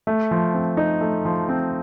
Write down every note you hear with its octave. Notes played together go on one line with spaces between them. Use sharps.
A3
F3
C4
D#4
A3
F3
C4